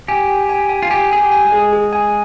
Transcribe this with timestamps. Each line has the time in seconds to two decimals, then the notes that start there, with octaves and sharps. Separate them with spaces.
0.08 G4 G#5
0.29 G#5
0.49 G#5
0.70 G#5
0.82 F4
0.90 G4 G#5
1.11 G#4 G#5
1.18 G4
1.32 G#5
1.45 G#3
1.52 G#4
1.73 G#4
1.93 G#5